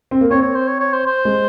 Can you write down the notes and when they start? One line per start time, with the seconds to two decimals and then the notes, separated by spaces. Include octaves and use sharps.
0.11 C4
0.21 A#3
0.31 C4 C#5
0.42 C#5
0.55 C5
0.68 C#5
0.80 C#5
0.93 C5
1.06 C5
1.25 G#3